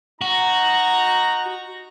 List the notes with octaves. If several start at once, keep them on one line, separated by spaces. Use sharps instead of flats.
D#4 F#4 A#5